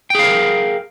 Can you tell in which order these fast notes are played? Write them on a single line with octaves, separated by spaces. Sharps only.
G5 G#4 F5 A#4